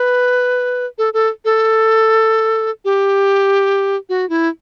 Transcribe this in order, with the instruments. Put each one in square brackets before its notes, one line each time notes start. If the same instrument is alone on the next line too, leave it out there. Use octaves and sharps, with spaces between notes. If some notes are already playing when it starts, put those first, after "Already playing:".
Already playing: [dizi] B4
A4
A4
A4
G4
F#4
E4